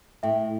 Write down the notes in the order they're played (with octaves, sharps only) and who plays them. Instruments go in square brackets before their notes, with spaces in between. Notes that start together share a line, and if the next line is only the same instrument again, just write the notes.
[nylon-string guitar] A2 [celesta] E5 G5